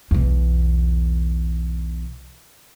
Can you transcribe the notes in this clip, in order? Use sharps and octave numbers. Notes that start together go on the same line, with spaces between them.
B1 E2